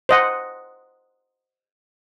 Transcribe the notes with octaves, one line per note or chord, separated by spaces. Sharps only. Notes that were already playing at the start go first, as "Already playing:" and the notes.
C5 D#5 F#5